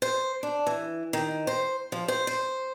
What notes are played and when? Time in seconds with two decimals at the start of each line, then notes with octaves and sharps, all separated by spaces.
0.02 C5
0.43 D4
0.67 E3
1.13 D#3
1.47 C5
1.92 F3
2.08 C5
2.27 C5